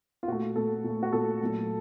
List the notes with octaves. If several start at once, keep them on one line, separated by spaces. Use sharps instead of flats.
F4
A#2 A3 F#4
A#2 A3 A4
A#2 A3
F#4
A#2 A3 A4
A#2 F#3 A3